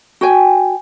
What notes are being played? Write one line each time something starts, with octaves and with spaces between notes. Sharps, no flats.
F#4 G5 G#5